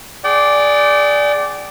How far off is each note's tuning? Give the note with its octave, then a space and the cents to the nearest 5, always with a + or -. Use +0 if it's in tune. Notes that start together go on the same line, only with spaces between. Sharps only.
G#4 +0 D5 -5 G5 -40